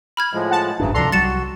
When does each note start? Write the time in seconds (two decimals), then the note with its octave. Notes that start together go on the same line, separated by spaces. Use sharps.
0.17 B5 F6 G#6
0.33 A2 F3 G#3
0.51 F#5 A5
0.79 G1 G#2 C#3 E3 F#3 D4
0.94 C#2 C3 F3 D4 A4 A#5 C6
1.12 C2 F#3 G3 F#4 A6 C#7 E7